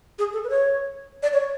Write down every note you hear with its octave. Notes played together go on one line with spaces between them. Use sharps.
G#4
A4
B4
C#5
D5
C#5